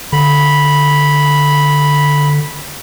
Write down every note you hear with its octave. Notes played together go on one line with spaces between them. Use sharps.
D3 B5